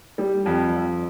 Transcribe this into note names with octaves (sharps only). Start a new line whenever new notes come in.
G3
F2
F2